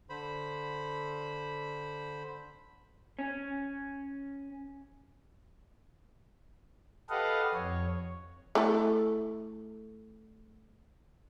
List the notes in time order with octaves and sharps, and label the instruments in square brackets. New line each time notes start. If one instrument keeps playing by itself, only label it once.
[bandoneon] D3 C5 B5
[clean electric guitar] C#4
[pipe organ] G4 A4 B4 D#5 F5 F#5
F2 C#5
[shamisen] A3 E4 A4